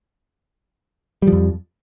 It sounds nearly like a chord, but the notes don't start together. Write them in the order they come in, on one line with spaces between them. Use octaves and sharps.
G3 F3 F2